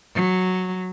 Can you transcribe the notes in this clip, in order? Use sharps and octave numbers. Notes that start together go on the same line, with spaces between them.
F#3